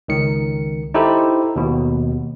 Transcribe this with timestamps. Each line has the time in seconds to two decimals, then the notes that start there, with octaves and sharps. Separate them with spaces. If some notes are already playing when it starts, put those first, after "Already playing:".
0.08 C#2 D#3 C#7
0.94 D#4 E4 G4 A4 C5
1.56 D#2 B2